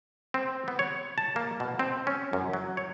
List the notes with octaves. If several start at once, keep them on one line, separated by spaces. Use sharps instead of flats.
C4
B3
C#5
A5
A#3
B2
C4
C#4
F#2
F#3
C#5